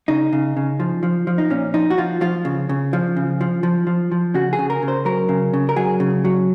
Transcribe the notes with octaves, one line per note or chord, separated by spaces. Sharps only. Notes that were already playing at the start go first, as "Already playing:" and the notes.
C#3 D#4
C#3
C#3
F3
F3
F3
D#4
A#2 C#4
F3 D#4
F#4
F3 F4
F3 F4
C#3
C#3
F3
C#3
F3
F3
F3
F3
C#3 F#4
G#4
C#3
A#4
C#3
C5
F#3 A#4
C#3
C#3
A#4
F#3 G#4
C#3
F#3